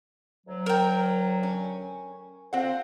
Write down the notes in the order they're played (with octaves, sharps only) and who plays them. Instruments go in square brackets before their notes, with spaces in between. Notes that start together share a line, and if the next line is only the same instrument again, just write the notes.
[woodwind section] D2 F#3
[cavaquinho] A#4 G5
[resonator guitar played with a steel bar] C#4
[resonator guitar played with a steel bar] C4 F#5 [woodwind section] F4 A4 C5